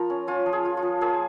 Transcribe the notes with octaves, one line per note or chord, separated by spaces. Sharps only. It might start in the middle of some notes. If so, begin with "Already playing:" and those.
Already playing: F3 F4 A#4
C#4
C#4 F4
F3
G#4
F4
F4
F3
A#3 G#4